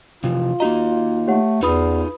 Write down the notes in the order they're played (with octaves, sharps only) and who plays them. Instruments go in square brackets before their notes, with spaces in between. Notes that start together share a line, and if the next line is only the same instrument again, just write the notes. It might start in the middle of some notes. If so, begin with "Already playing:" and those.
[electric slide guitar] C3 E3 F3 [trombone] F4
[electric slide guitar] A#3 D#4 D#5 [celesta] F#4 A#5
[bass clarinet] A3 [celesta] G4 C#5 F#5
[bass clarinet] E2 [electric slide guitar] D#4 F4 G#4 [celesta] B4 B5 D#6